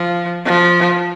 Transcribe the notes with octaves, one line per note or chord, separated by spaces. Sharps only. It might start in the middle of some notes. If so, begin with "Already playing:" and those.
Already playing: F3
F3